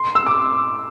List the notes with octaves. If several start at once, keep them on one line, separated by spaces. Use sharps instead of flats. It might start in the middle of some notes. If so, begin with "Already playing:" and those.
Already playing: C6
E6
D6